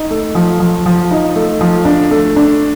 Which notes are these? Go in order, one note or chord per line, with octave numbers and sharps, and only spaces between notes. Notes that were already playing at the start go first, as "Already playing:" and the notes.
Already playing: D#4
A3
F3
F3
F3
D#4
A3
F3
D4
A3
D4